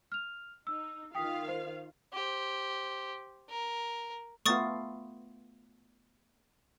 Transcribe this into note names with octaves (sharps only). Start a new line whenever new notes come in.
F6 F7
D#4 E6
D#3 F4 F5 G5 D#6 B6
C5
G4 C5
A#4
A3 B3 F4 C#6 D#6 A6